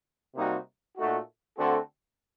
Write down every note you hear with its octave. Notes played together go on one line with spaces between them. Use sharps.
C3 G3 A#3 D#4 F#4
A#2 A3 D#4 F#4
D3 A3 C4 F#4 A4